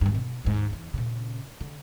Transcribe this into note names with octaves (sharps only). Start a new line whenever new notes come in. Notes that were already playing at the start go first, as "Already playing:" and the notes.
G#1 G2
B2
D#2 G#2
E2 E3
A#2 C#3
D3